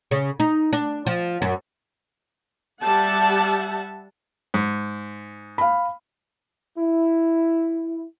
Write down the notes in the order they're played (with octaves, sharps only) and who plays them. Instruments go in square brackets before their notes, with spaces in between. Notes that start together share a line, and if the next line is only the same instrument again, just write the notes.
[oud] C#3
D#4
D4
F3
F#2
[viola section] G3 E5 F#5 A5
[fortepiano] G#2
[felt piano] F5 B5
[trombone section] E4